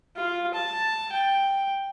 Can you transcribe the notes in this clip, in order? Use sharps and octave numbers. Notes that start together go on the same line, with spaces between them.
F4
A5
G5